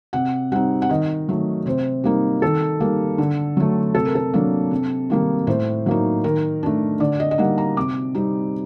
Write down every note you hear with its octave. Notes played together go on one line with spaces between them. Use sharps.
C3 F#5
G3 C4 D#4 F#5
F#5
D#3 D#5
F#3 A3
C3 C5
G3 A#3 D#4
D#3 A4
G3 A#3 D#4
D3
F#3 A3
C3 A4
A#4
A4
F#3 A#3 D4
C3
D#3 G3 A#3 D#4
A2 C5
F#3 A#3 D#4
D#3 A#4
A3 D4
D3 D5
D#5
D#5
G3 A#3 D#4 F#5
A#5
C3 D6
G3 C4 D#4